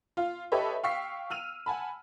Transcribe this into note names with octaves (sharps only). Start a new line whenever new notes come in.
F4 F5
G4 A4 B4 C#5 D#5 E5
F5 G5 C#6 E6 B6 C7
E6 F6 D#7 F7
F#5 G#5 A5 B5